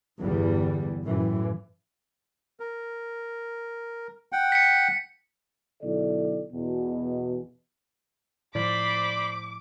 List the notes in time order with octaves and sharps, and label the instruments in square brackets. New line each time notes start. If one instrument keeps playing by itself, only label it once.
[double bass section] G1 E2 E3 G3
F#2 A2 E3
[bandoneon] A#4
F#5 G5
[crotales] B6 C#7
[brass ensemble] B1 D3 E4 A4 D5
E2 B2
[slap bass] A2 F3 [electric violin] C5 B5 [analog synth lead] D5 [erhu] D6